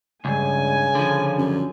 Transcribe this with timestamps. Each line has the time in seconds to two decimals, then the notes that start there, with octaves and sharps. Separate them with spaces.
0.25 C#2 G2 C#3 G#5
0.95 D3 F3
1.38 F#2